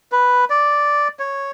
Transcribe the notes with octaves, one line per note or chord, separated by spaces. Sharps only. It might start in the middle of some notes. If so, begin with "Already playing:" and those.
B4
D5
C#5